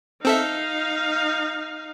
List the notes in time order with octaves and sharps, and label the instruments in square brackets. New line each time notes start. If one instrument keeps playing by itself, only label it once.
[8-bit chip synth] C4 A4 E5 [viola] D#4 F5